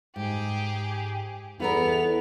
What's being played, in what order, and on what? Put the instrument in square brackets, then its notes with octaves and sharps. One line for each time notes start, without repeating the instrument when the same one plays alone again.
[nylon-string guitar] G#2 [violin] G4 G#4
[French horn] E2 [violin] B3 F7 [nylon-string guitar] E4 A4 A#4